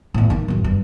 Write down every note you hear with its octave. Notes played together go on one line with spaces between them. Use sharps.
E2 A2
A#3 D#4
A1 F#2
G2